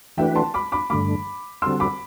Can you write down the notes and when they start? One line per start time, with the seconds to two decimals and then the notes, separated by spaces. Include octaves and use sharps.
0.17 E3 A3 D4 F#4 B4 E5 G5
0.35 A5 C6
0.54 B5 D6
0.72 B5 D6
0.90 G2 D3 A3 B5 D6
1.62 D3 G3 C4 F#4 A4 C6 E6
1.80 B5 D6